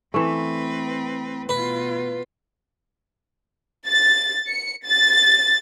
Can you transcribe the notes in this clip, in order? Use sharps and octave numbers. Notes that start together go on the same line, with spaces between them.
E3 A3 C4 B4
B2 F4 B4
A6
C#7
A6